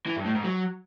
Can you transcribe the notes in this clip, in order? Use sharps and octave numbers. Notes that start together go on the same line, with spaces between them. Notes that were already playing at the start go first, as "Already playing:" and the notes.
E3
G2
A2
G#2
F#3